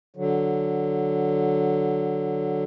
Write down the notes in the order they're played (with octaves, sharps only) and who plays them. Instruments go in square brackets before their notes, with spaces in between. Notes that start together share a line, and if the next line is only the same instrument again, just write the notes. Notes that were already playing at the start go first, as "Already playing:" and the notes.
[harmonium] D3 F#3